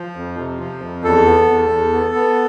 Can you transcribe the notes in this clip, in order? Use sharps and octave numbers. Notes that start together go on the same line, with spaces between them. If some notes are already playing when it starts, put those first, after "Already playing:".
Already playing: F3
F2
C3
F3
F2
E2 A4
B3
E2
E2
B3
B3